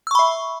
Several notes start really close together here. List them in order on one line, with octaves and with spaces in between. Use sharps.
E6 C#6 B5 E5